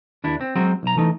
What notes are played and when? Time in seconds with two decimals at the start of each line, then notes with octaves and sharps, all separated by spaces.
0.24 D#2 D4 E4
0.41 C4
0.56 F#3 G#3 C4 F#4
0.83 B1 A#5
0.97 E3 A3 D#4